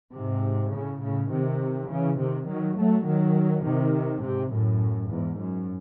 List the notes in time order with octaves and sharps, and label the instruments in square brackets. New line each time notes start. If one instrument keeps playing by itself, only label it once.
[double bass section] G#2 C3
A2 C#3
A2 C#3
C3 D#3
C#3 E3
C3 D#3
D#3 F#3
F#3 A3
D#3 F#3
C3 D#3
G#2 C3
F#2 A2
E2 G#2
F#2